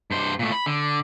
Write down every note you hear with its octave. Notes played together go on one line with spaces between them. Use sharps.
G2 C5
A#2 A3
B5
D3